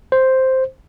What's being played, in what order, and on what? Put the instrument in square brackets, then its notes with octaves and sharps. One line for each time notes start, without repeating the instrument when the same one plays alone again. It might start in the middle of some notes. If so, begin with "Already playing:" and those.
[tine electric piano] C5